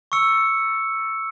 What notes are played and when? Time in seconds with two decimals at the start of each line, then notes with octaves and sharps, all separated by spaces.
0.12 C#6 E6 C#7